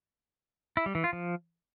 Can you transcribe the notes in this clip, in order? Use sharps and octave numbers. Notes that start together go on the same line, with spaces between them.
E4
G3
E3
F4
F3